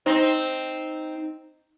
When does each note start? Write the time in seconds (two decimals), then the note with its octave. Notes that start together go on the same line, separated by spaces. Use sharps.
0.06 C4 D#4